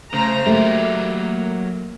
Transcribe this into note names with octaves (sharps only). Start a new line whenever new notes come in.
C#3 A3 C5 A#5
F#3 A3 A#3 G4